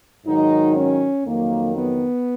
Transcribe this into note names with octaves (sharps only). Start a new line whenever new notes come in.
G#2 D#3 F#3 D#4
C#4
F2 D#3 F#3 A#3
B3